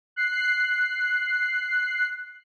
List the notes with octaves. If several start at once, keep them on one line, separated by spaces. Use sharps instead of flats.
F#6 C7